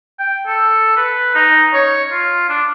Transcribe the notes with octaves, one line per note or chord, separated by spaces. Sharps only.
G5
A4
B4
D#4
C#5
F4
D4